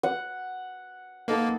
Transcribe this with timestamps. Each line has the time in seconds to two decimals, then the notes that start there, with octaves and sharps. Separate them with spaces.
0.03 F#5
1.28 A#3 B3 D#4 A4